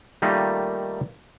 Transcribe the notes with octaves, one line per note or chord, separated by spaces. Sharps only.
D#3 G3 A3 A#3 D#4 F4